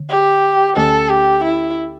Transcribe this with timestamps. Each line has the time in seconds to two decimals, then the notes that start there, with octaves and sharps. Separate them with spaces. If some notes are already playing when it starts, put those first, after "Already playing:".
Already playing: D3
0.09 G4
0.77 D2 D3 A3 A4
1.09 G4
1.44 E4